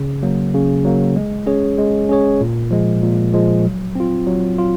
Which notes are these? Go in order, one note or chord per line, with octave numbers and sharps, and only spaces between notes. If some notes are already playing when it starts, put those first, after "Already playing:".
Already playing: C#3
F#3 A#3
C#3
F#3 A#3
G#3
C#4 G#4 C#5
G#3
C#4 G#4 C#5
A#2
F3 G#3
A#2
F3 G#3
F#3
C4 F4
F#3
F4